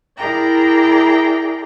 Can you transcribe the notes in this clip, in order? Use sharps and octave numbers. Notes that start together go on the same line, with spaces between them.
E4 G#4 A#4 D5 G5 A#5